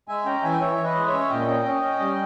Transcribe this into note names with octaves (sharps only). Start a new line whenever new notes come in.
G#3 E5 G#5
C#4 G5 A#5
E3 E5 G#5
G5
E3 C#5 E5
E3
B4 D#5
G#3
C#5 E5
C#4
A#2 D#5 G5
C#4
C#4
C#4
G3